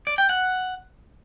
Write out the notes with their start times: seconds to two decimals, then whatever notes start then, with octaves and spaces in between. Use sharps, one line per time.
0.07 D5
0.18 G5
0.29 F#5